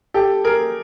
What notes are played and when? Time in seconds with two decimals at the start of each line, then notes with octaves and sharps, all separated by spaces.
0.14 G4 A4
0.44 G#4 A#4